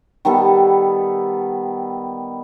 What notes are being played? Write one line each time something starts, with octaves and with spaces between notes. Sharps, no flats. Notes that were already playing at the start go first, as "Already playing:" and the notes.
D#3 G3 B3 A4